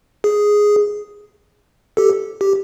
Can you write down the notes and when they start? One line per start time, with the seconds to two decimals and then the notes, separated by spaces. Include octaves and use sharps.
0.24 G#4
1.97 G4 A4
2.41 G4